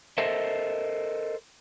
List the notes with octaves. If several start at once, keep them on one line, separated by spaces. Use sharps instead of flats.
A4 A#4 C5 D#5 E5